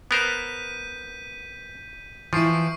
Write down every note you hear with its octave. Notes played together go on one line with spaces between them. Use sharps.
B3 A#4 C5 G6 B6 D#7
E3 F3 E4 C#6 C7 D7